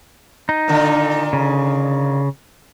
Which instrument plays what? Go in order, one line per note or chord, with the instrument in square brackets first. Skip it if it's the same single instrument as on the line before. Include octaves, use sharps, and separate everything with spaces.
[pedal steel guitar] D#4
[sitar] A#2 D3 D#3
[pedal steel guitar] C#3